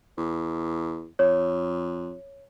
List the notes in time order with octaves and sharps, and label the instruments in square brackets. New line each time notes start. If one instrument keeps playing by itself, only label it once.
[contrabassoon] E2
[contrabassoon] F2 [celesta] C#5